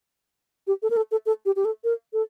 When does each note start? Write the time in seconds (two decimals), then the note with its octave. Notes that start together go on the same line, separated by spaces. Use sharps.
0.67 G4
0.83 A4
0.90 A#4
0.97 A4
1.11 A4
1.26 A4
1.46 G4
1.56 G4
1.65 A4
1.84 A#4
2.13 A4